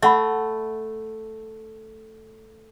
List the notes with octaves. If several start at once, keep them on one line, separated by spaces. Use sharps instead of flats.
A3 E5 F#5 B5